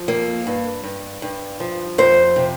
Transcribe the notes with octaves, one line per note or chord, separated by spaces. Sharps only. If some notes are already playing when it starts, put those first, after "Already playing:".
Already playing: F3
F2 A#3
G2
G2
G2
F3
F2 C5
C3